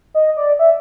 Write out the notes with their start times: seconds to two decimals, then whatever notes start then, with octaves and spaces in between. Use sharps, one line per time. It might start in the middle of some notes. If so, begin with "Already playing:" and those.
0.14 D#5
0.37 D5
0.59 E5